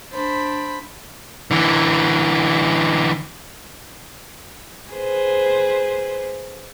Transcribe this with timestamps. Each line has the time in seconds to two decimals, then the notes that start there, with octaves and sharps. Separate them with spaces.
0.12 D4 C5 B5
1.51 D3 E3
4.91 G#4 B4 C5